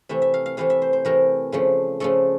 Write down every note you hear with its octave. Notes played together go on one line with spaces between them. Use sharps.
C3 E3 A3 E5
E5
F5
F5
C3 E3 A3 F5
E5
C5
C5
C3 E3 A3 A#4
C#3 F3 A3
C#3 F3 A3 A4